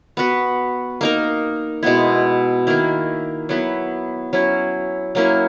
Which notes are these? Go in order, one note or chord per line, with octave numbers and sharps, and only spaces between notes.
B3 F#4 B4
A#3 D#4 A#4
B2 G#3 B3 E4
D#3 A#3 E4
F#3 B3 E4 B4
F#3 C#4 E4
F#3 A#3 C#4 E4